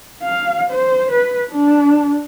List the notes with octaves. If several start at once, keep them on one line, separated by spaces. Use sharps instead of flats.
F5
C5
B4
D4